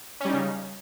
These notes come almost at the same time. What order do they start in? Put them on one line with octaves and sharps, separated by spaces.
C#4 G3 D#4 C#3